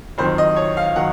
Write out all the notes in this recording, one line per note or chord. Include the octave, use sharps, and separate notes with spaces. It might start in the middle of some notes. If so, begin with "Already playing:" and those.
F2 D#3 F#3 C5
D#5
C#5
F5
D#3 F#3 F#5